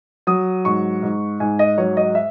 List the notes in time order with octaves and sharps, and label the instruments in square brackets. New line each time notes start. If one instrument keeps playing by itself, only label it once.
[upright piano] F#3 D#6
G#2 C#6
G#2
G#2 G#5
D#5
F#3 C#5
D#5
E5